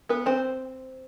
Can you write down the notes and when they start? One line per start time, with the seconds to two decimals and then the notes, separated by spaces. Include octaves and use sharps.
0.09 B3 B4
0.26 C4 C5